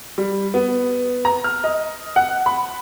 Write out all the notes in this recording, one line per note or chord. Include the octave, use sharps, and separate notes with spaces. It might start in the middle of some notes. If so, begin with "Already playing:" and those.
G3
B3
A#5
F6
D#5
F#5
B5